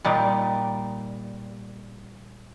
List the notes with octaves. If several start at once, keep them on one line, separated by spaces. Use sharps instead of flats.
A#2 G3 D#4